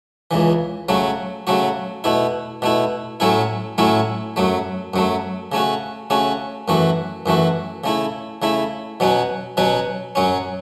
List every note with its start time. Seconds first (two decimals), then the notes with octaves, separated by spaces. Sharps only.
0.31 C#2 C#3 E3
0.89 C#3 F#3 A3 F#4
1.47 C#3 F#3 A3 F#4
2.04 B2 A3 E4
2.62 B2 A3 E4
3.20 A2 F#3 A3 C#4 E4
3.78 A2 F#3 A3 C#4 E4
4.36 F#2 F#3 A3
4.94 F#2 F#3 A3
5.52 C#3 A3 C#4 F#4
6.10 C#3 A3 C#4 F#4
6.68 F#2 E3 A3 F#4
7.26 F#2 E3 A3 F#4
7.84 C#3 A3 E4
8.42 C#3 A3 E4
9.00 B2 F#3 C#4 F#4
9.57 B2 F#3 C#4 F#4
10.15 F#2 F#3 C#4